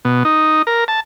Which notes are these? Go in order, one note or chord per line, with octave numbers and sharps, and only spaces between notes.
B2
D#4
A#4
A5